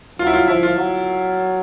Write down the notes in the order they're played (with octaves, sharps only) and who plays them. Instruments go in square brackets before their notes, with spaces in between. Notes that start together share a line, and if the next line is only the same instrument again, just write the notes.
[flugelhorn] F#3 [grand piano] F4
[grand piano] E4
F4
[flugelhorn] F3 [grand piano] E4
[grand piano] F4
[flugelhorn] F#3